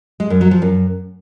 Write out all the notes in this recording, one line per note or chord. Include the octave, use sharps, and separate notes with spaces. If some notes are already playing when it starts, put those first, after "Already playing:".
G#3
F#2
F#3
F3
F#2